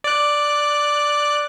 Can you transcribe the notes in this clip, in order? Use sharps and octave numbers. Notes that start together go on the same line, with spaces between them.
D5 F#6